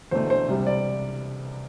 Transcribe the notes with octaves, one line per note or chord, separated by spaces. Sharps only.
E1 E2 D3 A3 C5
C5
C2 C3 G3
D5